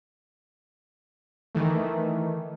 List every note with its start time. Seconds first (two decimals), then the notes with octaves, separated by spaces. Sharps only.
1.55 D#3 E3 A3